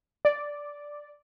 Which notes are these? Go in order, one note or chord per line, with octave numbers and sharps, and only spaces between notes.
D5